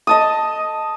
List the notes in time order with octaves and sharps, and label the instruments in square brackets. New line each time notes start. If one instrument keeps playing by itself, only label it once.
[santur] D#5 A5 D#6